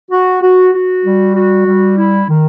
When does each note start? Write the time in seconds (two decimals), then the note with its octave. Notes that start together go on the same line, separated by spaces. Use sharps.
0.11 F#4
0.42 F#4
0.73 F#4
1.04 G3
1.35 F#4
1.66 G3
1.98 E4
2.29 D#3